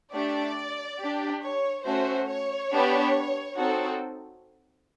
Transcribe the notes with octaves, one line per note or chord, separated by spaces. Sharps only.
A3 D4 G4 D5
D4 G4
C#5
A3 C#4 F#4 C5
C#5
B3 D4 G4
C4 D#4 F#4 A4